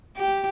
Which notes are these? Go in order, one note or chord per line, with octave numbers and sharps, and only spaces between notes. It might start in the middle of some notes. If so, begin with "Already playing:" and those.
G4